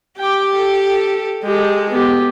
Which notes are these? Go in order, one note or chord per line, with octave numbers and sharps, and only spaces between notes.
G4 G5 D6
A4
A4
G#3 G4 A4
B3 G4